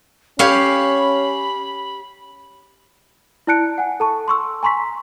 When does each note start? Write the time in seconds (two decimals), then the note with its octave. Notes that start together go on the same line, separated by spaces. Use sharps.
0.39 C#4 G4 C#5 F5 B5
3.47 E4 D5 A5 F#6 C#7 D7
3.78 F#5 G#5
4.00 A4 A5 C#6
4.28 C6 C#6 E6
4.63 G#5 A#5 C6 C#6 B6